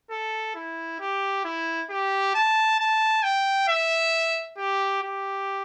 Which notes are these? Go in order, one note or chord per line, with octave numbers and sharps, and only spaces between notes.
A4
E4
G4
E4
G4
A5
A5
G5
E5
G4
G4